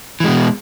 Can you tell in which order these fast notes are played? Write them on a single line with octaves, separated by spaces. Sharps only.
E3 G#3 B2